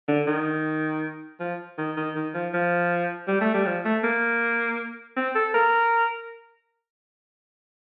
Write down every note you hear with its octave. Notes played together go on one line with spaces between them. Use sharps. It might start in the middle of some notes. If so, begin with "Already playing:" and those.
D3
D#3
F3
D#3
D#3
D#3
F3
F3
G3
A3
G3
F3
A3
A#3
C4
A4
A#4